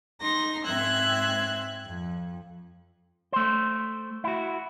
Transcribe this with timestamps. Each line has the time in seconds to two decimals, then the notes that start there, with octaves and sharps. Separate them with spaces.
0.21 D#4 A#5 C6 A#6
0.65 G#2 C4 E5 E6 F#6 G#6
1.84 F2
3.33 A3 C5
4.24 E4 F#4